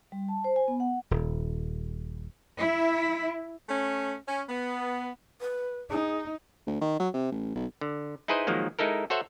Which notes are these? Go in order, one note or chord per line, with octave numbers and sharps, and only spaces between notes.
G3
A5
C5
G#5
B3
F#5
D#1
E4
A3 C#4
C#4
B3
B4
D#4 G#4
D2
D#3
F#3
C3
A1
B1
D3
D#4 E4 G#4 B4 C5 D#5
D#3 F3 F#3 G#3 A#3
G#3 D#4 E4 A4 A#4
F#4 A4 C5 C#5 E5 F#5